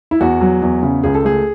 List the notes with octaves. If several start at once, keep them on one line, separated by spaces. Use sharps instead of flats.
E4
E2 F#4
F#3
E2
C#3
C#2 G#4
A4
A3 G#4